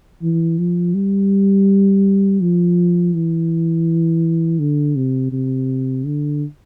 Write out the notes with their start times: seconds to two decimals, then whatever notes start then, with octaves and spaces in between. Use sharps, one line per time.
0.22 E3
0.58 F3
0.94 G3
2.41 F3
3.14 E3
4.59 D3
4.96 C3
5.32 C3
6.06 D3